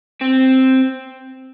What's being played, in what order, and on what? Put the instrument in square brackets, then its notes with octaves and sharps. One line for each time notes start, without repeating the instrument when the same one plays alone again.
[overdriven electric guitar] C4